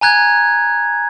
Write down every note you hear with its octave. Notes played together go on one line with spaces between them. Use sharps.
G#5 A#5 F#6 G#6